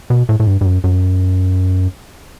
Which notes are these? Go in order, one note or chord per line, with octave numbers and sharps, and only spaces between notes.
B2
A2
A2
G2
G2
F#2
F#2